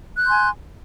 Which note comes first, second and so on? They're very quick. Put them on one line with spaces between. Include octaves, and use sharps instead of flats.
F#6 G6 C6 G#5